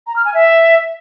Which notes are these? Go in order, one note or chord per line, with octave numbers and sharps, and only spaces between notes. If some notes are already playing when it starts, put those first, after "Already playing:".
A#5
F6
G#5
E5